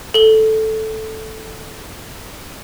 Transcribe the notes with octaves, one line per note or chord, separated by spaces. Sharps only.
A4 G7